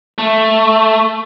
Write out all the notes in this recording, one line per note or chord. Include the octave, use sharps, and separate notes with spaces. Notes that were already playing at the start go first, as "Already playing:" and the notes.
A3